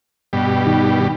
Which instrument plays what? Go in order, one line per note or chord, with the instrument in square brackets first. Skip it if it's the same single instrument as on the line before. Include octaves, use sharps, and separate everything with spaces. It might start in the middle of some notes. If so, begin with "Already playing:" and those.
[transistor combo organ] G2 B2 G4
[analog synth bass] D#3